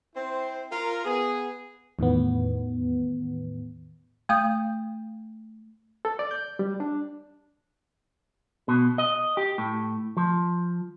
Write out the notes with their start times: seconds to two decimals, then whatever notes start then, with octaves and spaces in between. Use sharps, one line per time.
0.16 C4 E4 C5
0.71 F4 A#4
1.05 B3 G#4
1.99 E2 A2 D#3 B3
4.29 A3 F5 D#6 G6
6.05 A4
6.19 D5
6.31 G6
6.59 G3
6.80 D4
8.68 B2
8.98 D#5
9.37 G4
9.58 A2
10.17 F3